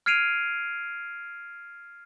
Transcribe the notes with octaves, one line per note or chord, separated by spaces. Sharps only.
F6 G#6 C7 D7 D#7 F7